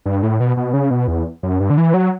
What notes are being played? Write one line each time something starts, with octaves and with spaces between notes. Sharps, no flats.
G2
A2
B2
B2
C#3
B2
E2
F#2
G2
D3
E3
F#3